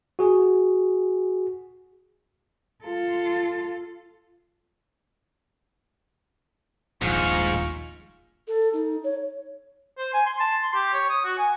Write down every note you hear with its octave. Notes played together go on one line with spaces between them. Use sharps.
F#4 G#4
F4 A4
D#1 A#1 G#2 F4 C#6 F6
A4
D#4
C#5
C5
G#5
C6
A5
C6
G4
C#5
D#6
F#4
G#5